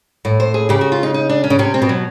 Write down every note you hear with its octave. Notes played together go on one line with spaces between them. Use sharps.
A2
C5
G#4
C#3 G4
F#4
F4
D#4
D#4
D4
C#4
C#3
C3 C#4
C4
B2
F#3